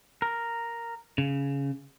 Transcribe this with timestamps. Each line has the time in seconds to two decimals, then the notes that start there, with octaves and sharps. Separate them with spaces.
0.22 A#4
1.18 C#3